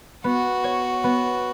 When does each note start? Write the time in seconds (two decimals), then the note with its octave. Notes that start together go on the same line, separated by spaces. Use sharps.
0.24 B3 F#4
0.64 C#5
1.04 B3